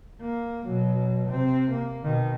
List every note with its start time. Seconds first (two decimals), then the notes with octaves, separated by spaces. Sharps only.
0.21 A#3
0.65 B2 F#3
1.27 C3 C4
1.70 A#3
2.03 B2 D#3